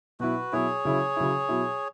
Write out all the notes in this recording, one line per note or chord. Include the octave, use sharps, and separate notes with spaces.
B2 F#3 E4 F#4 B4
B2 F#3 E4 G#4 C#5
C#3 F#3 E4
C#3 F#3 E4
B2 F#3 E4